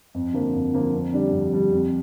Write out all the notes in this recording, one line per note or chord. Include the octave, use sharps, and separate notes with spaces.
F2
D3 F3 A#3
F2
D3 F3 A#3
F2
D3 G3 D4
F2
D3 G3 D4
F2